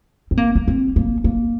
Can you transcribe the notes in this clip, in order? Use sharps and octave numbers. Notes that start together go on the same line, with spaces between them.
C4
A#3
A#3
C4
A#3
A#3